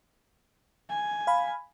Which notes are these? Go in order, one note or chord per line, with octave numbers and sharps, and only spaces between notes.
G#5
F5 B5